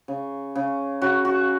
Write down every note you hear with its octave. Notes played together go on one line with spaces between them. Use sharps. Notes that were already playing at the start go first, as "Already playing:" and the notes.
C#3
C#3
C#3 F#4
F#4